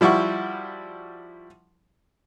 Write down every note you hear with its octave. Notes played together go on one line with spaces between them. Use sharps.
F3 G3 E4 F#4 C#6